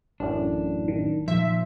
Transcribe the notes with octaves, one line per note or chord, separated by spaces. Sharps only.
A1 F#2 A2 D4
D#3
A#2 F3 E5